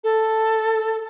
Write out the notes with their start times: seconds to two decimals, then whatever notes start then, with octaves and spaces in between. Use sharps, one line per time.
0.04 A4